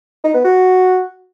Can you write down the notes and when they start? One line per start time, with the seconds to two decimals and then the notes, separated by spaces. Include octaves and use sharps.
0.24 D#4
0.34 B3
0.44 F#4